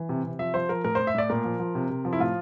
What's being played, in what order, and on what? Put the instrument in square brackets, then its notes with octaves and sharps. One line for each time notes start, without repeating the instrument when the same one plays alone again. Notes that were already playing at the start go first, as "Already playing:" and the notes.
Already playing: [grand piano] E3
C3
C3
F3 E5
F3 C5
F3 A#4
A2 A#4
A2 C5
E5
A2 D5
A#2 A#4
F3
F3
C3
C3
F3
E4
A2 F4